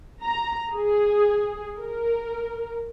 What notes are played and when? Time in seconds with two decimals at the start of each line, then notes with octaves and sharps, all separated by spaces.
0.22 A#5
0.73 G#4
1.78 A#4